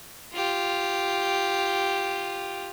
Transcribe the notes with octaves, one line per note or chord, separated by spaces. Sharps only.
F4 G4